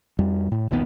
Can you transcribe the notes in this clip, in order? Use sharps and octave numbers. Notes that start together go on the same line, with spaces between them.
F2 G3
A2
E1 A#1 D#3 B3